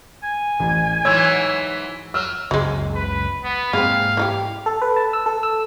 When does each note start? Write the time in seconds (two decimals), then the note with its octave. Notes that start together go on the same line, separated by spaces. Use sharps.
0.24 G#5
0.60 A1
1.05 G#2 E3 F#3 C#5 E6 G#6
2.14 F#3 E6 F6
2.51 F#1 C#2 C#3 F#3 G#3
2.95 B4
3.44 B3
3.73 G#2 G#3 A#3 C4 F5
4.17 E3 D#4 G4
4.66 A4
4.82 B4
4.96 A5
5.13 E6
5.26 A4
5.43 E6